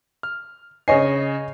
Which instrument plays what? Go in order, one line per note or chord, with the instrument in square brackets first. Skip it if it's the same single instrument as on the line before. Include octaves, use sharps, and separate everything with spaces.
[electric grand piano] F6
[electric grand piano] C#3 C#6 C7 [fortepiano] C#5 D#5 G#5